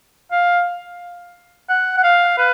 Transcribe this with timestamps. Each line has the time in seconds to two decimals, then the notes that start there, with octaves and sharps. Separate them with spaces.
0.32 F5
1.69 F#5
1.98 F#5
2.04 F5
2.38 B4